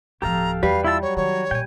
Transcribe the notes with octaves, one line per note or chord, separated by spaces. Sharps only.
D1 F3 G4 A4 F5 A#5
E2 G3 B4 F5
E4 F4 A5 E6
F#3 C#5
D#3 C#5
A#2 G5 G#5